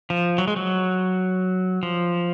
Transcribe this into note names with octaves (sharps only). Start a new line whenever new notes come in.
F3
F#3
G#3
F#3
F3